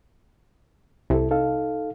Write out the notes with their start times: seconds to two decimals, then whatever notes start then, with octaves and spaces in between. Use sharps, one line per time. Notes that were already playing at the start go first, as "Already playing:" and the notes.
1.10 C2 E4 A4
1.31 D#4 A4 F5